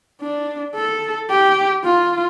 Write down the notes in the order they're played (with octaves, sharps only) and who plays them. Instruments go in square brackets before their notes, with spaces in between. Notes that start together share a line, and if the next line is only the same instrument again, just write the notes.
[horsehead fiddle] D4
A4
G4
F4